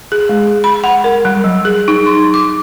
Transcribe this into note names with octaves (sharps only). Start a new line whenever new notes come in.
G#4
G#3
B5
F#5
A#4
G3
F#3
G#4
D#4
C6
D6